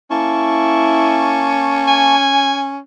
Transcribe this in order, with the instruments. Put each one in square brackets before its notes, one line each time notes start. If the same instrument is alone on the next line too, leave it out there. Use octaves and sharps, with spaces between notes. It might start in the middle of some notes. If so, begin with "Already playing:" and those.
[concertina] A#3 A5 C#6 [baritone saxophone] C#4 [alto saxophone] E4
[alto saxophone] G#5